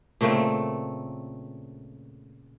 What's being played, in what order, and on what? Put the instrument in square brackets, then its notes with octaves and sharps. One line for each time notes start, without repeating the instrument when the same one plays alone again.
[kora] A#2 C#3 A3 C4